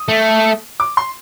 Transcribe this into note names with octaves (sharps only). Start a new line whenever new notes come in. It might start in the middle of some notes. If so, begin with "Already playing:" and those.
Already playing: D#6
A3
D6
C6